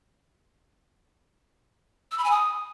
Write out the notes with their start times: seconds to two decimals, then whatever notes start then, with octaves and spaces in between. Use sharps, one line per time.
2.11 E6
2.18 B5
2.24 G#5
2.31 D#6